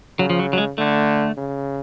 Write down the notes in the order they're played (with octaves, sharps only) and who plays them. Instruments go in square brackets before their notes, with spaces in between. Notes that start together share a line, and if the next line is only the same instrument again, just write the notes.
[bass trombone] C#3 [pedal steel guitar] F#3
[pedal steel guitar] F3
F#3
F#3
G#3
[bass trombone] D3 [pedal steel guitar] A3
[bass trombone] C#3